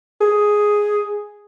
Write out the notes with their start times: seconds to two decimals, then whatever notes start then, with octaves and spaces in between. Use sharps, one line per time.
0.21 G#4